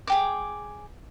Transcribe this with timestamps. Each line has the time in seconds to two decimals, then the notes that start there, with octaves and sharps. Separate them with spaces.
0.07 G#4 G5 D6